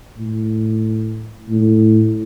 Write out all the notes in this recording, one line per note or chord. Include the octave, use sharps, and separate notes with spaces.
A2
A2